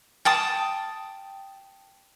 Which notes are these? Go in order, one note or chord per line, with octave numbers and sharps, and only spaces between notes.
G5 A5 D#6